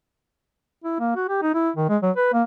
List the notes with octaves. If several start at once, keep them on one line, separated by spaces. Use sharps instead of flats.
E4
A#3
F#4
G4
D#4
E4
D#3
G#3
F#3
B4
A#3